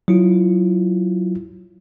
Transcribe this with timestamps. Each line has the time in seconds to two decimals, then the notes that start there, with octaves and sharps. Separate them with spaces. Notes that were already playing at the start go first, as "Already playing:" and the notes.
0.08 F#3 E4 F4